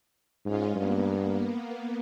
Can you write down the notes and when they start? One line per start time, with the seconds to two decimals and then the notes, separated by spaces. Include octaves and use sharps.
0.45 G#2 G#3 C#4 F4
0.76 G2 A#3 B3